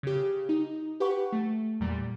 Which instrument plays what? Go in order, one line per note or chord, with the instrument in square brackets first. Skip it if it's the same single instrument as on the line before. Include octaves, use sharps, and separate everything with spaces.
[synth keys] C#3 G4
D#4
G4 B4 F#5 C#6
A3
E2 A#2 G3